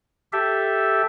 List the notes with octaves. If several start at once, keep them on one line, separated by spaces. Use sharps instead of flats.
G4 A4 E5